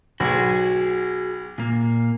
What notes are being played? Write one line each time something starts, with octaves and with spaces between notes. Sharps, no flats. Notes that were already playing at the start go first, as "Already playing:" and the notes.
B1 F#4 G#4
A#2 A#3